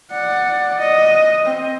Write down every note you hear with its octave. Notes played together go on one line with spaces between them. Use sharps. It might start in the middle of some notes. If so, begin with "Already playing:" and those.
D5 F#5
D#5
C4